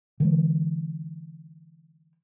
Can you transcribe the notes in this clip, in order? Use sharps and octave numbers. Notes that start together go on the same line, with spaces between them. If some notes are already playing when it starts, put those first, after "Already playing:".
D3 E3 G#3